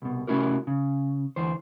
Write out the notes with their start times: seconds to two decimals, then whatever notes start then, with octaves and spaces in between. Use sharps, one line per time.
0.02 C2 B2
0.27 C3 A3 C#4 E4 F#4 A#4
0.67 C#3
1.36 D2 E3 C5